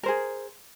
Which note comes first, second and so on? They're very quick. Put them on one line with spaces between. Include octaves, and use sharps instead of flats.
A#4 C5 G#4